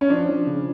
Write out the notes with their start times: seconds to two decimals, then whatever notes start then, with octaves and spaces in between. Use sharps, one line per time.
0.01 C#4
0.10 F3 D4
0.29 F3
0.46 C#3